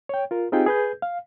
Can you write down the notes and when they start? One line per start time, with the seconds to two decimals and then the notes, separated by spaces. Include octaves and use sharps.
0.09 C#5 G5
0.31 F4 A#4
0.52 C4 D#4 F4 G4 G#4 G5
0.66 G#4 B4 G6
1.02 F5